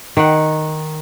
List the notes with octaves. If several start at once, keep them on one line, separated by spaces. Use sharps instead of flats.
D#3 F#5